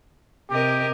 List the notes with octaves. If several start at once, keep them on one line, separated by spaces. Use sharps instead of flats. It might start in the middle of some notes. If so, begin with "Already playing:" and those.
C3 G4 A#4 D#5